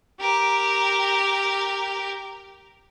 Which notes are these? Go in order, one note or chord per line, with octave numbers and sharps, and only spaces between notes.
G4 A#4